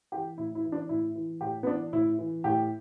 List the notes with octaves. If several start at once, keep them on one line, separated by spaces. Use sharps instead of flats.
E3 G4
A2 E4
E4
E3
D4
A2 E4
E3
A2 G4
B3
E3 D4
A2 E4
E3
A2 G4